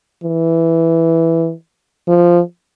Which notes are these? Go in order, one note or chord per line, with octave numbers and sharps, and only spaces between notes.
E3
F3